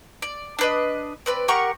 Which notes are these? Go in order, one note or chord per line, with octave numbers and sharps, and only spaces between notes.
D5
D4 B4 D#5
C4 B4 D5
G4 A#4 F#5 C#6